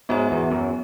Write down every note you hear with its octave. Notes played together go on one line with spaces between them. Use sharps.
G#2 B3 F#4 C#5
E2
F#2